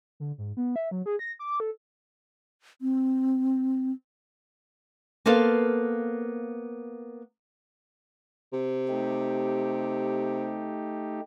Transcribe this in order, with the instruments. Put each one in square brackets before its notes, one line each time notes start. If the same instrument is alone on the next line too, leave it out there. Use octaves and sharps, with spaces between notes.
[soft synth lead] D3
G#2
B3
E5
F#3
G#4
A#6
D6
A4
[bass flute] C4
[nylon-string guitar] A#3 B3 A4 C5 F5
[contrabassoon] C3
[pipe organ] A3 D#4 G4